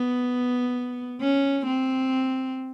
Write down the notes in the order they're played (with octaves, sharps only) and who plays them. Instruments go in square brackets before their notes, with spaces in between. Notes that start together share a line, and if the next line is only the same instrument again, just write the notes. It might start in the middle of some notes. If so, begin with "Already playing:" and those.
Already playing: [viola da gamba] B3
C#4
C4